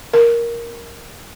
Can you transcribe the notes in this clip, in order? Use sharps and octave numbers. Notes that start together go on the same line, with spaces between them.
A#4